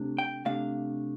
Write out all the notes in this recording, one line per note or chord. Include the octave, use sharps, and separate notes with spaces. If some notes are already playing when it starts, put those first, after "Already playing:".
Already playing: C3 A3 D4
G5
C3 A3 D4 F5